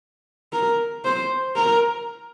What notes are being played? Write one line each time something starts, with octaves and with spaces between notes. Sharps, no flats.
A#4
C5
A#4